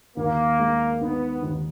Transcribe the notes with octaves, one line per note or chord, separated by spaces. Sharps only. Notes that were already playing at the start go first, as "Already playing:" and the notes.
D#2 A#3
G#3
D#3 B3
D#2